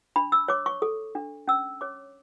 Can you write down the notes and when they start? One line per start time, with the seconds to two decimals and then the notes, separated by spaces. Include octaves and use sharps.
0.16 D4 B5
0.32 E6
0.48 C#5 D6
0.66 C#6
0.82 A4
1.15 D4
1.48 C#4 E6
1.81 C#5 D6